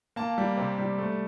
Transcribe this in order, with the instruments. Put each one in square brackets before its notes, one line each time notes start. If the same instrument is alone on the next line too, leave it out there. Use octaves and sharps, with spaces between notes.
[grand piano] A#3 A5
G3
C3
G3
A3